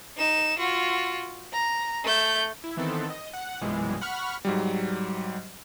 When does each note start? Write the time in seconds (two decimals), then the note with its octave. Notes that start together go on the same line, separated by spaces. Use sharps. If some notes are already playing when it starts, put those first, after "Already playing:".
0.17 D#4 E7
0.58 F4 F#4
1.53 A#5
2.03 A3 G6
2.64 E4
2.77 D#3 E3 B3 C4 A4
3.10 D#5
3.33 F#5
3.61 A#1 F#2 B2 E3 G3 G#3
4.01 F#5 B5 C#6 F6
4.45 G#2 F#3 G3